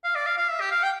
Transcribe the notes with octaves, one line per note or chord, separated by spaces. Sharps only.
F5
D5
F5
F5
E5
G4
F5
G5